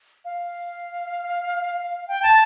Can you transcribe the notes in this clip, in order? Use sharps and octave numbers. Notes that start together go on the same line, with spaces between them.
F5
G5
A5